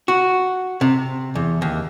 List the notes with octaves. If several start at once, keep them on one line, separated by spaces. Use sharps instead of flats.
F#4
C3
E2
D#2